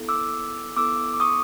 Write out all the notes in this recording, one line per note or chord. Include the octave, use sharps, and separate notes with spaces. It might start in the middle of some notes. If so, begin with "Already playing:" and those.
Already playing: B3 E4 A4
D6 E6
B3 E4 A4 D6 E6
D6
C#6 D#6